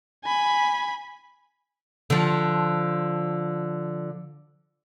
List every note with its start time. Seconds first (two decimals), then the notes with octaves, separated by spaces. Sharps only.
0.25 G#5 B5
2.10 D3 F3